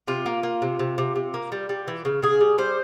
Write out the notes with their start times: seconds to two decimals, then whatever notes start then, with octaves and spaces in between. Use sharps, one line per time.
0.07 C3 F4
0.26 A#3
0.43 A#3
0.62 C3
0.79 C3
0.98 C3
1.16 C3
1.34 A#3
1.52 G3
1.69 G3
1.88 E3
2.05 C#3
2.22 C#3 G#4
2.40 G3
2.58 G3 C5